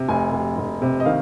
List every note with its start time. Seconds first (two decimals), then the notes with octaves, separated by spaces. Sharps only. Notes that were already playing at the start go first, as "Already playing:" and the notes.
Already playing: C3
0.08 F1 G#5
0.32 F1
0.57 F1
0.82 C3
1.00 D#5
1.05 D#3 F5